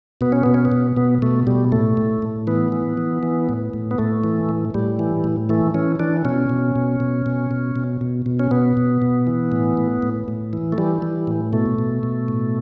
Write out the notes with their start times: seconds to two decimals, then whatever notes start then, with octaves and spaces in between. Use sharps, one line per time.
0.21 B2 B3
0.32 C#4
0.43 B2 B3
0.54 C#4
0.65 B3
0.72 B2
0.97 B2 B3
1.22 B2 A3
1.47 B2 G3
1.72 A2 A3
1.97 A2
2.22 A2
2.47 E3 B3
2.72 E3
2.97 E3
3.23 E3
3.49 A2
3.73 A2
3.91 B3
3.98 A2 A3
4.24 E3
4.49 A2
4.74 A2 G3
4.99 E3
5.24 A2
5.49 E3 A3
5.74 E3 C#4
5.99 E3 D4
6.25 B2 C#4
6.50 B2
6.76 B2
7.00 B2
7.26 B2
7.51 B2
7.76 B2
8.01 B2
8.26 B2
8.39 C#4
8.51 B2 B3
8.77 B2
9.02 B2
9.27 E3
9.52 A2
9.77 A2
10.02 A2
10.28 A2
10.53 E3
10.72 A3
10.78 E3 G3
11.02 E3
11.27 A2
11.53 B2 A3
11.79 B2
12.03 B2
12.28 A2